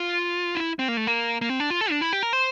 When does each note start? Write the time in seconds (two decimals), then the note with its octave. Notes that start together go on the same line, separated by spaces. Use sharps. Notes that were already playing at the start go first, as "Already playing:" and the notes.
Already playing: F4
0.55 E4
0.79 C4
0.88 A#3
0.97 A3
1.07 A#3
1.41 A#3
1.49 C4
1.60 D4
1.70 F4
1.81 A4
1.91 D4
2.01 E4
2.13 G4
2.23 A#4
2.33 C5